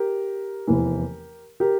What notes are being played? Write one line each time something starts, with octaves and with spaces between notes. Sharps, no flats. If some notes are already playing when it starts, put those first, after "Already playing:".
Already playing: G4 A#4
F1 E2 E3
G4 A#4